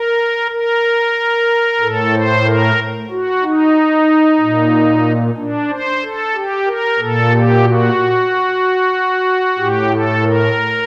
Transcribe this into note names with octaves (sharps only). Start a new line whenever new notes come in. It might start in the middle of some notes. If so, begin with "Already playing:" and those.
Already playing: A#4
A#4
A2 A4
C5
A#4
F#4
D#4
A#2
D4
C5
A4
G4
A#4
A#2 A4
G4
F#4
A2 G4
A4
A#4